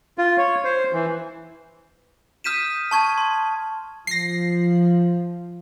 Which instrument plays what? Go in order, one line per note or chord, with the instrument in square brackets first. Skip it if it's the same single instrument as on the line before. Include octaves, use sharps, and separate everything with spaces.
[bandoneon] F4
C#5
C5
E3
[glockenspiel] D#6 F6 G6 B6 D#7 E7
A5 C#6 G#6
C6
[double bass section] F3 [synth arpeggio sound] A#6 C7